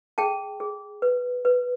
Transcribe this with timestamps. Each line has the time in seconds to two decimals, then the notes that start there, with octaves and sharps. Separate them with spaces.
0.18 G#4 G5 A5
0.60 G#4
1.02 B4
1.45 B4